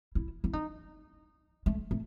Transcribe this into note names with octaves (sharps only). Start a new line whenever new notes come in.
E4
E4
D#4
A3
A3